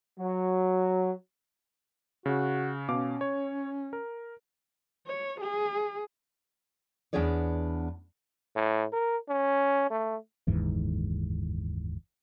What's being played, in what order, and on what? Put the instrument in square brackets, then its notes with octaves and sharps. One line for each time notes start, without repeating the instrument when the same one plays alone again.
[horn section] F#3
[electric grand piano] C#3 [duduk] F#4
[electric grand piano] B2 F5 D6 [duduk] C#4
[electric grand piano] C#5
A#4
[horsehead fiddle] C#5
G#4
[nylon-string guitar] E2 B3 D4 G#4 C#5 D5
[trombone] A2
A#4
C#4
A3
[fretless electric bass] F#1 D#2 G#2 E3